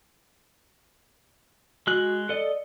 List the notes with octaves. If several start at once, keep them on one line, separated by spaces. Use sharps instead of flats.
G#3 F#4 F#6
A4 D5 D#5